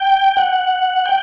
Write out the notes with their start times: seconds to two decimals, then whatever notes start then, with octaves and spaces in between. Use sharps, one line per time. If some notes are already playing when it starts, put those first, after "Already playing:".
Already playing: G5
0.37 F#5
1.06 G5